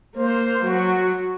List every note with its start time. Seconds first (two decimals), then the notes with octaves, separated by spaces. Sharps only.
0.16 A#3 C5
0.64 F#3 F#4